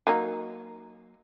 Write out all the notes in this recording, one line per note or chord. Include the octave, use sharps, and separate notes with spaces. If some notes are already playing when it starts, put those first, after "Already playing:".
F#3 A#3 D#4